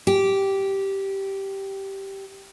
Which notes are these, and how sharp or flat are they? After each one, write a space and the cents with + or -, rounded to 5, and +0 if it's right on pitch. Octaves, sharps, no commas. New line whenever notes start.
G4 -10